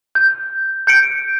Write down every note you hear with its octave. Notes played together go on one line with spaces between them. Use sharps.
G6
G6 C#7 D7